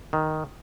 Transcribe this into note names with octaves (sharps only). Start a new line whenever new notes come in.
D#3